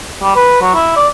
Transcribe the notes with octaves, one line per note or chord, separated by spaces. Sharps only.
G3
B4
F#3
E4
D5